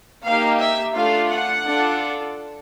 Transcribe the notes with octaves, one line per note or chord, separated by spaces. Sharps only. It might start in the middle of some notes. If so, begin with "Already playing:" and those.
A#3 D#4 G4 F5
E5
A3 D4 F4 F5
F#5
D4 F4 A4